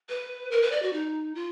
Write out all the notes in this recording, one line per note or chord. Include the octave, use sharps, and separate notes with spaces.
B4
A#4
B4
D5
F#4
D#4
F4